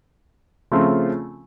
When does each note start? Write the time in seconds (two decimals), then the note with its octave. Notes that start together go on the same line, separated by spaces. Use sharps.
0.71 C#3 F3 A3 C4 F4